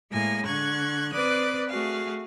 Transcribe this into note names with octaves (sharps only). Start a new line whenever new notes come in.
A2 G#3 A#3 G#5 A#6
D3 C#6 F#6 G#6
C4 B4 D5 D6 D#6 F#6
A3 F#4 G#4 F5